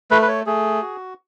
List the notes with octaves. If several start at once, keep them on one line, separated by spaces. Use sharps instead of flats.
A3 B4
B4
C#5
A3 G#4
F#4